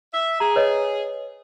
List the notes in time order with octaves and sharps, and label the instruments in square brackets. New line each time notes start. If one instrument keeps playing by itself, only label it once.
[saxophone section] E5
[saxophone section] G#4 [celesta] A#5
[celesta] B4 C#5 D#5